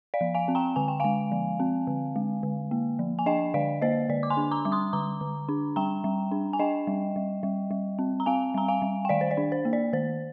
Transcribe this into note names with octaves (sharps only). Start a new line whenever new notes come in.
D5 F5
F3
F5 G#5
C4
G5 A#5
D3 G#5
G5
G#3 F5 G#5
F3
C4
D3
G#3
D3
A#3
F3
G#5
D4 D#5 G5
D3 D5 F5
A#3 C5 D#5
D3 D5
D6
G#5 C6
D4
A#5 D6
G3 D6
C6 D#6
D3 A#5 D6
D3
D4
G3 G5 A#5
G3
D4
G#5
D4 D#5 G5
G3
G3
G3
G3
C4
A#5
C4 F5 G#5
G3 A#5
F5 G#5
G3
G5
D#3 D5 F5
C5
D5
D4
C5
A#3
D5
D#3 C5